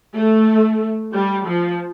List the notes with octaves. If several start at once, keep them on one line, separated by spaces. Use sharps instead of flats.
A3
G3
F3